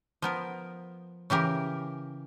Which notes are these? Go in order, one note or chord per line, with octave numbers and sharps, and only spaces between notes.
F3 B3 A#4
C#3 E3 G4 A#4